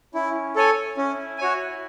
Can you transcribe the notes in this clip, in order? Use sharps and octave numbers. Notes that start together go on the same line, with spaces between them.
C#4 E4
A4 C#5 G#5
C#4 E4
F#4 C#5 G#5